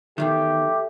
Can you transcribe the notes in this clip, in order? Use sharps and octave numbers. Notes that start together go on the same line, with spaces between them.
E2 G2 D#3 A3 G4